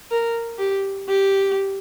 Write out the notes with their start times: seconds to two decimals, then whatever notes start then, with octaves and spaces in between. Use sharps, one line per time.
0.11 A#4
0.59 G4
1.09 G4